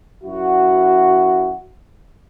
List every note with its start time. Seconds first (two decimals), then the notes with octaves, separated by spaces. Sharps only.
0.24 F#2 E4 F#4